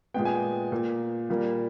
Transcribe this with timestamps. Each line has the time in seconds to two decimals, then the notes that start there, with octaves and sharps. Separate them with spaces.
0.14 A#2 G#3 B3 G5
0.25 G#5
0.36 G5
0.72 A#2 A#3
1.30 A#2 G3 A#3